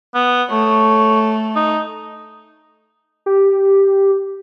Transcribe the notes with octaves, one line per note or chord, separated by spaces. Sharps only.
B3
A3 C#5
D#4
G4